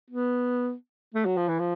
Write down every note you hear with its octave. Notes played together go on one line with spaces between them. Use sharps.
B3
A3
F#3
F3
E3
F3